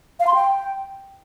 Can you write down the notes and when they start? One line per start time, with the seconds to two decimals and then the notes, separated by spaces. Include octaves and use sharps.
0.20 F5
0.27 C6
0.34 G5